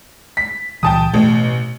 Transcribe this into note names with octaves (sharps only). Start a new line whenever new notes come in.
B6
C#2 A#2 E3 G5 A5 D#6
A1 B2 B3